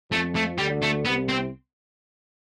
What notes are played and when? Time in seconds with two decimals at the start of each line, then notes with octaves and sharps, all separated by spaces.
0.11 F2 F3 A3
0.35 A3
0.58 D2 D3 G3
0.82 A3
1.06 C2 C3 B3
1.29 C4